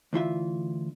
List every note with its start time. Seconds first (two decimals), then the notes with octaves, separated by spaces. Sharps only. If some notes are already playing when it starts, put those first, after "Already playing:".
0.13 D2 E3 F4 E5